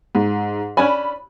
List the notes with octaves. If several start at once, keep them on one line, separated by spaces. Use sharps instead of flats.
G#2
C#4 D4 G#5 B5